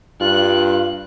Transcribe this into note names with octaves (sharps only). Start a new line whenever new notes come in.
G2 F4 F#6